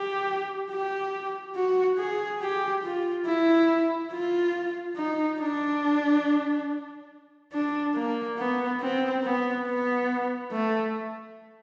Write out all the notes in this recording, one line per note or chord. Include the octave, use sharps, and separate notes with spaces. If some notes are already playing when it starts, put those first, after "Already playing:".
Already playing: G4
G4
F#4
G#4
G4
F4
E4
F4
D#4
D4
D4
A#3
B3
C4
B3
B3
A3